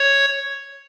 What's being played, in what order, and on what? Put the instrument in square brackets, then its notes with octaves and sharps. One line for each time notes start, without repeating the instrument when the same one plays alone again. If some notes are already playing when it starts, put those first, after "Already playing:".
Already playing: [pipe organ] C#5